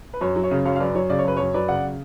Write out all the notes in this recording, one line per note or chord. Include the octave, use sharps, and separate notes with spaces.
B4
F#2 C#5
F#3
C#5
C#3
F#2 C#5 F5
F5
F#2 B4 D5
F#3 C#5
C#3 D5
C#5
F#2 B4
F#2 C#5
F#3 B4 D5
C#3 D5 F#5